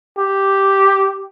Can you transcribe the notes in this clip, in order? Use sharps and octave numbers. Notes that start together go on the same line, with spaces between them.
G4